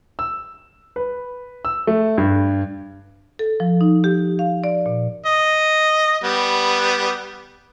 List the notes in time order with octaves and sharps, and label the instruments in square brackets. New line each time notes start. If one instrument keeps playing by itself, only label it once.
[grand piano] E6
B4
E6
A3
G2
[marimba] A4
F3
D#4
G4
F5
D5
A#2
[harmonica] D#5
G3 B3